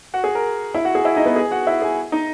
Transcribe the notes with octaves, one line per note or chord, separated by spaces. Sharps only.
F#4 F#5
G#4
A#4
E4 E5
F#4 F#5
G#4 G#5
E4 E5
D#4 D#5
B3 B4
G#4 G#5
F#4 F#5
E4 E5
G#4 G#5
D#4 D#5